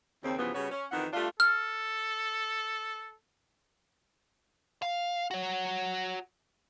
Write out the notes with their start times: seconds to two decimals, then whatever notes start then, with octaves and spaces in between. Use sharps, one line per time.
0.23 D#2 C#3 C4
0.38 G2 C#3 E3 F3 B3
0.54 C#3 G3 B3 F#4 B4 C#5
0.71 C#4
0.91 F2 D#3 E3 B3 A#4 F#5
1.13 G3 A3 D4 F4
1.40 A4 F6
4.82 F5
5.31 F#4 C#5